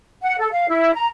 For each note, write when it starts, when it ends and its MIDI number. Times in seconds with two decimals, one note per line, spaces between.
0.22 0.35 78
0.39 0.48 69
0.52 0.68 77
0.69 0.94 64
0.94 1.06 82